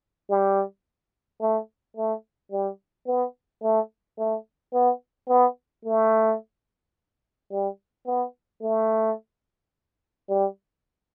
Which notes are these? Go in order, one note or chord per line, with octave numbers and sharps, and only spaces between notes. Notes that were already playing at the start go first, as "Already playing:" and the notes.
G3
A3
A3
G3
B3
A3
A3
B3
B3
A3
G3
B3
A3
G3